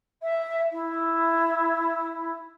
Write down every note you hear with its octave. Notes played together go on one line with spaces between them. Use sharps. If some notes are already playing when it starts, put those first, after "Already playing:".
E5
E4